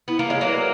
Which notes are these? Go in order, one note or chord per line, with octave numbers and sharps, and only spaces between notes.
B3 E4
A#3
G#3 G#4 C#5 E5
F#3 A#3
B4